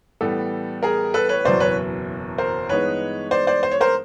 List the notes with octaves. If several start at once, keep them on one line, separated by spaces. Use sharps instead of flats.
A2 E3 G3 B3 A4
G#4 A#4
A4 B4
B4 C#5
F#1 E2 B2 F#3 C5 D5
B4 C#5
A#4 C5
G2 E3 G#3 B3 D#4 B4 C#5
C5 D5
C5 D5
C5
C#5
A#4 C5